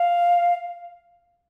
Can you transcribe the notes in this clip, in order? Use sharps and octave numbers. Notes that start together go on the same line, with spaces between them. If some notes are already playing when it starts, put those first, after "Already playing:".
Already playing: F5